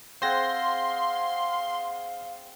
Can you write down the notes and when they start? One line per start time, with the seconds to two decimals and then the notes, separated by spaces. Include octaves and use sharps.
0.22 C4 G#4 C5 F5 F#5 C6 A#6